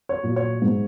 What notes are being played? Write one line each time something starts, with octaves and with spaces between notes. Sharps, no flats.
C#5
A#2 F#3
C#5
G#2